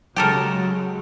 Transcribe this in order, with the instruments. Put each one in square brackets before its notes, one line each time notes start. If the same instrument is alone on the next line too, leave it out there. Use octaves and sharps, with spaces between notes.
[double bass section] C#3 F#3 G#3 [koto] G4 A4 A#4